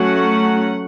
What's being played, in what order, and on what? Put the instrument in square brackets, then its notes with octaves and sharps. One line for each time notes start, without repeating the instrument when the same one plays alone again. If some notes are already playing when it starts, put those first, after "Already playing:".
Already playing: [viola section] F#3 A3 C#4 F#5